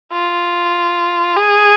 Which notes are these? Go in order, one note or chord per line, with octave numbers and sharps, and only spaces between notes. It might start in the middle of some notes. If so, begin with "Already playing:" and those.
F4
G#4